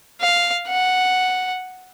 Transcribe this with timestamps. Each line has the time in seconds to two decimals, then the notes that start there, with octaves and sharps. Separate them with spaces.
0.21 F5
0.68 F#5